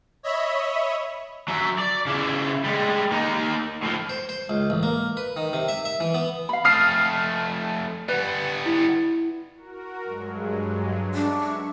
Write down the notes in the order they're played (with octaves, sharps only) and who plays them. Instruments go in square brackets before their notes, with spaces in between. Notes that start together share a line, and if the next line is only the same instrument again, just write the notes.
[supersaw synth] C#5 D#5 E5 B5
[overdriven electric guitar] F#3 E5
D5
C#3 E4
G3 G#3
A#3 D#4
A2 F3
[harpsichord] C5
C5
C#2
A1
A#3
B4
D#3
C3
E5
E5
E3
B3
[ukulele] F5 B5
[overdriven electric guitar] F2 A3 [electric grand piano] D#6 F6 C7
[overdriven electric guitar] G3 B3 [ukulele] B4
[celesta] E4
[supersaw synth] F#4 A#4
G2 F#3 G#3
[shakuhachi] D4 [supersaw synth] E5 C#6